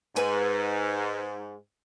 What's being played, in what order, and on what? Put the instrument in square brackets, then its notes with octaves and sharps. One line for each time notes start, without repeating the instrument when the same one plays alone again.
[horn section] G#2 [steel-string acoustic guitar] B4 G#5